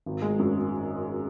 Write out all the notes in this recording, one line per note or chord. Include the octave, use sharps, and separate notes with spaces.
G#1
G#3
F#2